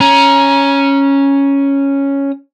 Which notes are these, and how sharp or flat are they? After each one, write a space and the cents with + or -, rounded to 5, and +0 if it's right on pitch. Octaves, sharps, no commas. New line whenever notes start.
C#4 +0 A#5 +20